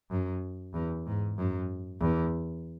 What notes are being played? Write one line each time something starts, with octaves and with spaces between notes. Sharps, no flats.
F#2
E2
G#2
F#2
E2